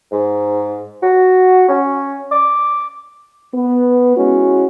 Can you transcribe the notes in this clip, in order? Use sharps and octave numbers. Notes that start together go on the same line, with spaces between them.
G#2
F#4
C#4
D6
B3
G#3 C#4 E4 F#4